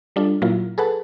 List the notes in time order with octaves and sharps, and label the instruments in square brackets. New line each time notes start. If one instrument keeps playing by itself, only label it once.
[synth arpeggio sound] G3 D4 F4 A4
A#2 F#3 A#3 E4 F4
G#4 A4 B4 F#5 A5